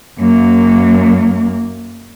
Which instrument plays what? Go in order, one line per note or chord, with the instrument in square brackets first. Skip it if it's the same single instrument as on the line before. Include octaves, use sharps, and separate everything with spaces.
[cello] F#2 A#3